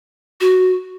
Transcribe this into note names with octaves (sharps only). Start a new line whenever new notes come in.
F#4